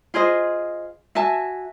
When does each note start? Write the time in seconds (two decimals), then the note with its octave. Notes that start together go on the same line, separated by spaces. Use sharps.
0.14 F4 G#4 C5 D#5
1.15 F#4 E5 G#5 A5